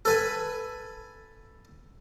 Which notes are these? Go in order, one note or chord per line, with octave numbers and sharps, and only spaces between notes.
A4 B4 G#5